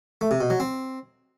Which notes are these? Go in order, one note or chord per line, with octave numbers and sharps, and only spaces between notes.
A3
C3
B2
F#3
C4